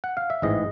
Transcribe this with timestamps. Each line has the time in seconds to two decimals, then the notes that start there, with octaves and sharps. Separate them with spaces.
0.04 F#5
0.17 F5
0.30 E5
0.42 A1 G#2 E3 D#5